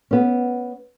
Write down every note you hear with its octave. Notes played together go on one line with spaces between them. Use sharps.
B3 C#4